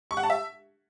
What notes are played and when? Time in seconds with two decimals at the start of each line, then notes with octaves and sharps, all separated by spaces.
0.11 C#6
0.17 F#5
0.23 A5
0.30 E5